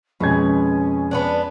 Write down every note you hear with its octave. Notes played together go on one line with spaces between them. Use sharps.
F2 B2 G#3 C#4 G#6
B3 C4 D4